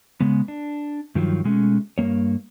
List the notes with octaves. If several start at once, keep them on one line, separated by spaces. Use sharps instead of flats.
C#3 G#3 B3
D4
G2 D#3 F3 F#3
B2 G#3 A3 C#4
G2 D#3 A#3 C#5